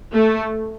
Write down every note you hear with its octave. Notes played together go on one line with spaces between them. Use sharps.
A3